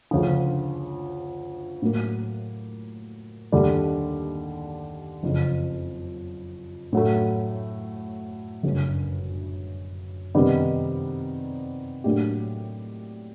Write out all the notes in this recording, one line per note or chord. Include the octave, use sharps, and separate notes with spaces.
D2 C#3 F3
A2 F#3 A#3
D#2 D3 G3
F#1 F2 C#3 F3
A2 F#3 A3
G1 F#2 C#3
C3 D#3 G3 B3 D#4
A2 F#3 A#3 D4 G4